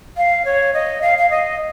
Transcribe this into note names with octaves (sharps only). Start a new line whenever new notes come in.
F5
C#5
D#5
F5
F5
D#5